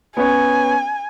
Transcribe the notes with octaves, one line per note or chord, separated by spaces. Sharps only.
B3 C#4 C#5 G#5